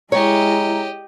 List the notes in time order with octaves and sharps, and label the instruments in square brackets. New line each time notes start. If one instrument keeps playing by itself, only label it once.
[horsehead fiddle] G#3 E4 [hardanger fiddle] G4 D#5 [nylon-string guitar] C#5 [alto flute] A#5